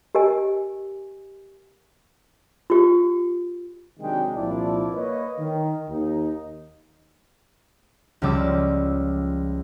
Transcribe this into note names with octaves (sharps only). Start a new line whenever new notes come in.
G4 A#4 D#5 G#5
F4 G4
C3 D#3 F#3 G#3 D4 G5
C2 A#2 F3 D4 E4 D5
A#3 B4 C#5 D#5
D#3
D#2 D#4
C#2 F3 G3 D6 E6